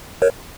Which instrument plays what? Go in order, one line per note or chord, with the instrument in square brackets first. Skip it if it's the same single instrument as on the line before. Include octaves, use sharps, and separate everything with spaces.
[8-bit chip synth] A#4 C#5